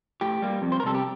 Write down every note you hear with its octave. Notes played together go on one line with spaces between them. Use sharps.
A2 G4
G3 A#3
F2
C5
A#4
C3 G3 A4
G4